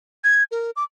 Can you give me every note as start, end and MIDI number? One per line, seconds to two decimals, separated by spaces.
0.24 0.44 92
0.52 0.71 70
0.76 0.84 86